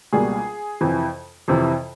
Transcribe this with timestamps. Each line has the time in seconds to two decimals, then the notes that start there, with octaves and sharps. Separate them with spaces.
0.13 C#2 B2 G3 A#3 G#4
0.81 F2 C3 E3
1.48 F2 C3 E3